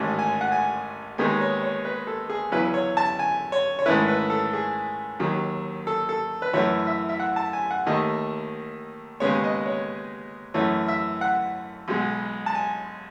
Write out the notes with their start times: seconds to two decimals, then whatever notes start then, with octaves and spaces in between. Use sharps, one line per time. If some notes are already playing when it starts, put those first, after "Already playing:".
Already playing: A1 G#2 D#3 A3 C#4 G#5
0.19 G#5
0.41 F#5
0.52 G#5
1.18 D#2 D#3 G#3 B3 D#4
1.41 C#5
1.63 C#5
1.85 B4
2.07 A4
2.29 G#4
2.52 E2 C#3 F#3 C#4 E4 B4
2.74 C#5
2.97 A5
3.19 G#5
3.52 C#5
3.79 C#5
3.86 G#2 D#3 A3 C#4 E4 B4
4.08 B4
4.30 A4
4.53 G#4
5.20 D#2 D#3 F#3
5.87 A4
6.09 A4
6.42 B4
6.53 F#2 E3 A3 E4 C#5
6.87 E5
7.09 E5
7.20 F#5
7.36 A5
7.53 G#5
7.71 F#5
7.86 D#2 D#3 A3 D#5
9.20 D#2 C#3 G#3 B3 C#5
9.44 D#5
9.66 C#5
10.54 F#2 E3 A3 C#5
10.88 E5
11.21 F#5
11.88 B1 B2 G#3
12.46 A5
12.55 G#5